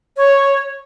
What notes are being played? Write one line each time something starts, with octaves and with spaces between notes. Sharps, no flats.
C#5